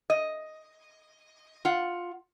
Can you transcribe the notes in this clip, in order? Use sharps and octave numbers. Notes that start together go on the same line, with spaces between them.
D#5
F4 F#5